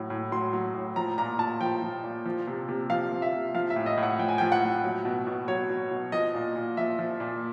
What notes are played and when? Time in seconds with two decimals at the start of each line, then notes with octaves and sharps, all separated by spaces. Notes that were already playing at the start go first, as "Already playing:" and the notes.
Already playing: A2 F#3
0.10 A2
0.32 F#3 C6
0.53 F#3
0.74 A2
0.96 F3 A#5
1.18 A#2 A#5
1.39 A#2 A5
1.61 F3 G5
1.82 F3
2.04 A#2
2.25 F3
2.47 C3
2.69 C3
2.90 F3 F5
3.12 F3
3.22 E5
3.33 C3
3.54 F3 F5
3.70 E5
3.76 A2
3.86 D#5
3.98 A2
4.03 F#5
4.19 F3 G5
4.29 G#5
4.38 F3 G5
4.52 F#5
4.62 A2
4.83 F#3
5.05 B2
5.27 B2
5.48 F#3 C#5
5.69 F#3
5.91 B2
6.12 F3 D#5
6.34 A#2
6.56 A#2
6.77 F3 E5
6.99 F3
7.20 A#2